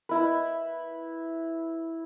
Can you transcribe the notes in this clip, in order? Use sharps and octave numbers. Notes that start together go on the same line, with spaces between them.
E4 B4